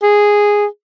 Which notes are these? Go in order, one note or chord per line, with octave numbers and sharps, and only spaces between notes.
G#4